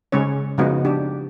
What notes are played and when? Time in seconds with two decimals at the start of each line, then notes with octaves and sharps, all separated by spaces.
0.12 C#3 G#3 C#4 C#5
0.58 C#3 F3 G#3 B3 D#4 F#4
0.85 D4 G4